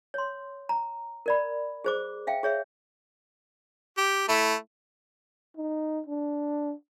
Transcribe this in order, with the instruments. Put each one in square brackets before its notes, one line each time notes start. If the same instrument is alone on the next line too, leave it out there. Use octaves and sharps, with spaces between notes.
[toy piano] C#5 C6
A#5
A#4 D5 B5
G#4 C5 D6
E5 F5 G5
G#4 C#5 E5
[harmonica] G4
A3 E4
[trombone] D#4
D4